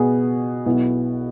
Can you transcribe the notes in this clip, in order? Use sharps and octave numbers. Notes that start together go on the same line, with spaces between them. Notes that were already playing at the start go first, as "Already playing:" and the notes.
Already playing: B2 B3 G#4
B1 B2 B3 E4